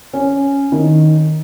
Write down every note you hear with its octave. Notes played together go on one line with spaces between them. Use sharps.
C#4
D#3